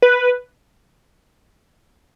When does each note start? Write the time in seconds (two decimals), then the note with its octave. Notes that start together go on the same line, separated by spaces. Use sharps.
0.02 B4